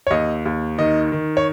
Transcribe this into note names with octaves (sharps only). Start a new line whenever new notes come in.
C#5
D#2 D#5
D#2
D#3 D#5
D#3
C#5